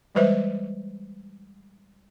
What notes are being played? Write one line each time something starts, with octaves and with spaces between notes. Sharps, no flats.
E3 G3 G#3 B4 C5 E5